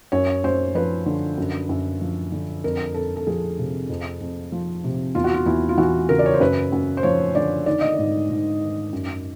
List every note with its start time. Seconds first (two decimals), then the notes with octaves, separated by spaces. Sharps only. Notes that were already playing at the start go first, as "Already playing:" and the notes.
0.12 F#2 C#5
0.44 F#2 C5
0.75 F3 B4
1.06 D3
1.38 F#2
1.69 F#2
2.01 F3
2.32 D3
2.64 F2 A#4
2.94 F2 A4
3.16 A4
3.27 F3 G#4
3.59 C3
3.89 F2
4.21 F2
4.52 F3
4.84 C3
5.15 E2 F4
5.24 F#4
5.34 F4
5.46 E2 E4
5.69 F4
5.78 E3 F#4
6.09 C#3 A#4
6.19 D5
6.26 C#5
6.34 C5
6.40 F#2 B4
6.72 F#2
6.97 C5
7.03 F3 C#5
7.35 D3 D5
7.66 D#3 D5
7.81 D#5
7.94 G#2 D5
8.30 G#2
8.61 D#3
8.93 F#2